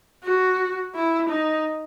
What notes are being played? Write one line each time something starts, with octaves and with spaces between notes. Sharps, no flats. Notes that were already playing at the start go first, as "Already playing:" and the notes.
F#4
E4
D#4